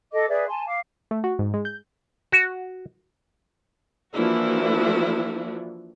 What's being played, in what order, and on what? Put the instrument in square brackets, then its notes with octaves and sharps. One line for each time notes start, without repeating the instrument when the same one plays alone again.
[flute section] A4 D#5 D6
G#4 B4 D5 E5
G#5 A5 C6
F5 D6
[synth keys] A3
F#4
G#2
G#3
G6
[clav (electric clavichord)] F#4
[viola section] E3 F3 A#3 D4 E4 F#4